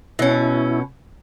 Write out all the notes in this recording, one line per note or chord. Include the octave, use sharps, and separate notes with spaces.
B2 C#4 E4